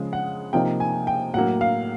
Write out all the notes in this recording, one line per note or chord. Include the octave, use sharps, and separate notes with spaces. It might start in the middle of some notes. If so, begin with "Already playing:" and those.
Already playing: C#3 F3 G#3
F#5
C3 F3 A#3 D#4 G5
G#5
G5
A2 F#3 A#3 F#5
F5